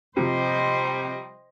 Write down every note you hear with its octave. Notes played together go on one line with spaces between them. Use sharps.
C3 F3 G3 C5 D#5